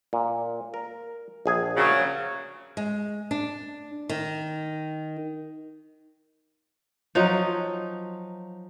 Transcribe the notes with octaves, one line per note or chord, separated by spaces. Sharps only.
A#2
A#4
A#1 G#4 G#5
C#3 F#3
G#3
D4
D#3
F3 F#3 D#4